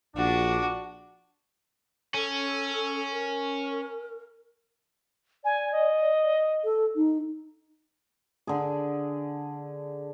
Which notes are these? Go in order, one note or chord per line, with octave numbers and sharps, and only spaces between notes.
A#1 D4 F#4
C#4 A4
A#4
D5 G#5
D#5
A4
D#4
D3 G#4